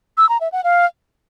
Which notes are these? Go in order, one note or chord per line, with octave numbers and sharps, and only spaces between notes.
E6
A#5
E5
F#5
F5